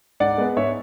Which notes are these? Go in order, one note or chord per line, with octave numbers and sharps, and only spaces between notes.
G#2 D5 F#5
G#3 B3
G#2 C#5 E5